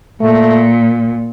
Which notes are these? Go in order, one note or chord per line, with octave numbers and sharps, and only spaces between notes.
A#2 A3